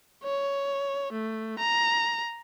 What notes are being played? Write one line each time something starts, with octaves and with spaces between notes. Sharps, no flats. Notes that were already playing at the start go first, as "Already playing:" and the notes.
C#5
A3
A#5